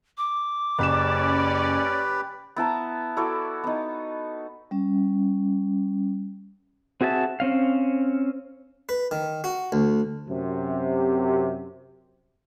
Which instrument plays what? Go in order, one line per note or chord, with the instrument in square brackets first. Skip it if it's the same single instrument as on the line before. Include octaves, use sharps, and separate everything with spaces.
[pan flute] D6
[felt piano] F#1 B5 E7 [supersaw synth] C#4 D5 [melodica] G4 B4
[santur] B3 E4 A5 A#5
E4 F#4 A4 D5
B3 D#4
[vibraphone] G3 C#4
[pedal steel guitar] C4 F#4 G#4 E5 A5
C4 C#4 F5
[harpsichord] B4
D#3
F#4
D2
[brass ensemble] F#2 C3